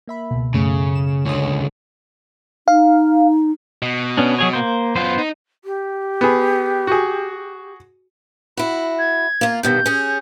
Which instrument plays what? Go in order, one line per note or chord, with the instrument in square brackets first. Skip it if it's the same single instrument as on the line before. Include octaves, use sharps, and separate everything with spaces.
[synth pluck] A#3 E5 B5
C#2 B2
[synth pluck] F#2 A3 [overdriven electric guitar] C#3
[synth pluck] E7
[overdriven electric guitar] C#2 D3 [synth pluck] C#5 D#6
[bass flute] D#4 [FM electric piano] F5
[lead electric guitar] B2
[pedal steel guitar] B3 C#4 D4
F#3 G#4 C#5
A#3 C5
[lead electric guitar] F#2 F4 [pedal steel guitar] B3 C5
[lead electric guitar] D#4
[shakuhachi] G4
[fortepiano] B3 G#4
F#4 G#4
[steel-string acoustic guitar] E4 F#4 [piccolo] B5
[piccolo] G#6
[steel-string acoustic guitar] A#3 F4
[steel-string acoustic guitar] G2 B2 D#3 [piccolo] G6
[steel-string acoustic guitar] C#4 G#4